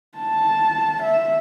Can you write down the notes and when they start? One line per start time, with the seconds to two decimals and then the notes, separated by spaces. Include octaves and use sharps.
0.18 A5
1.03 E5